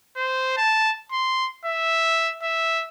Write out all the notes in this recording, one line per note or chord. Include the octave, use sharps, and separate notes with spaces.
C5
A5
C6
E5
E5